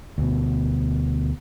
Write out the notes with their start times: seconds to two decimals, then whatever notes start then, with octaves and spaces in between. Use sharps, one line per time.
0.18 D2 B2